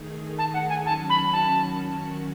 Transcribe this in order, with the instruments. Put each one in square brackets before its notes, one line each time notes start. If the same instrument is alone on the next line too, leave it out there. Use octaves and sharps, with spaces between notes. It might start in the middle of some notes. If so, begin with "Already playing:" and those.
Already playing: [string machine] D#3 A3 D#4 G#4
[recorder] A5
F#5
G#5
[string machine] D#3 F#3 C#4 F#4 [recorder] A5
[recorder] B5
A5